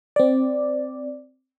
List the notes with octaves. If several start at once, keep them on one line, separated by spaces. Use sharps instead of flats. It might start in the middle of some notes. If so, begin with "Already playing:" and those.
C4 D5